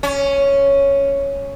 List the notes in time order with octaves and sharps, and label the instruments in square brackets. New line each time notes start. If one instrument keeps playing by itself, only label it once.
[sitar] C#4